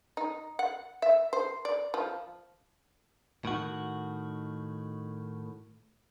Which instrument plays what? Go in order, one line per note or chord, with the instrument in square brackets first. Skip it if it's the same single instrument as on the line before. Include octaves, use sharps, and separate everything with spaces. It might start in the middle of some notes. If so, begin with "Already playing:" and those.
[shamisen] D#4
F#5
E5
C5
D5
F3
[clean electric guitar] A2 D#3 F#4